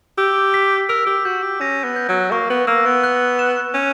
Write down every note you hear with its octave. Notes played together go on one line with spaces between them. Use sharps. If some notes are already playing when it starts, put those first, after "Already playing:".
G4 E6
B6
A#4 E6
G4
F#4 G6
G4
C#4 A#6
B3
G6
F#3
A#3 C#6
B3
A#3 E6
B3
F#6
E7
C#4 F#6